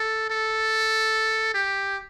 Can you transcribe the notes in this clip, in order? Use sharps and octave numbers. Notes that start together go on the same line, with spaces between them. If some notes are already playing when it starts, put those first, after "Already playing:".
Already playing: A4
A4
G4